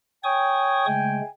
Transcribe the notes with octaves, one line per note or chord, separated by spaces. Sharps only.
C#5 G5 G#5 C#6 D#6
C#3 G#3 A3